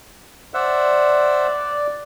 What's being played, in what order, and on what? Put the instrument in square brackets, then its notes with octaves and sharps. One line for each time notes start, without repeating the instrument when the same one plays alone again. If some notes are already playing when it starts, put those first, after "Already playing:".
[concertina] C5 E5 F#5 [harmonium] D5